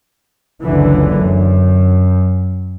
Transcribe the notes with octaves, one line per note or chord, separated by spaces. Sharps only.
F#1 C#2 D3 E3
F#2